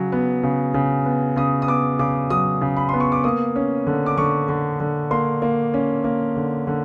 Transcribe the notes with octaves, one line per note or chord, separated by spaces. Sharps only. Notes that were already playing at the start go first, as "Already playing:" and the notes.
Already playing: C#3 F#3
B3
C#3
C#3
B3
C#3 D#6
D#6
B3 D6
C#3 D6
F#3 D#6
C#3
B5
B3 C6
C#6
D6
A#3 D#6
C#4
D3
D6
D3 C#6
D3
D3
A#3 C6
A#3
C#4
A#3
D3
D3